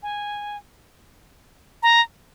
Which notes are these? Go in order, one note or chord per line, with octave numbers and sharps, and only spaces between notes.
G#5
A#5